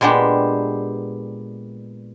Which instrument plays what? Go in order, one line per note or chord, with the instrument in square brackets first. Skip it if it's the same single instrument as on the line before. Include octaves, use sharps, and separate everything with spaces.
[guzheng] A#2 G#3 B3 D4 G4